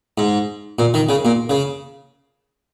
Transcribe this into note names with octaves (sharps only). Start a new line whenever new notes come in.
G#2
A#2
D#3
C#3
A#2
C#3